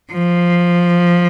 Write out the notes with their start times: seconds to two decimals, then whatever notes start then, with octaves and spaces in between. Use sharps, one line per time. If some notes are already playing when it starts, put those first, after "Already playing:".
0.13 F3